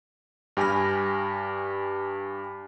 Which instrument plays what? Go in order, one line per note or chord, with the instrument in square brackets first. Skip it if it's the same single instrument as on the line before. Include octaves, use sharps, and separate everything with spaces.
[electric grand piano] G2 G4 G#5 B5 F6 A#6